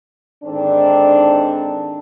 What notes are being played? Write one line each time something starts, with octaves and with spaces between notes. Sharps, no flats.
G#2 D3 D#3 C4 D4